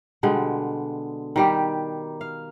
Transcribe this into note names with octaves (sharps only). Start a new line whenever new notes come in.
B2 D3 G3 G#3
D#3 G3 G4
F5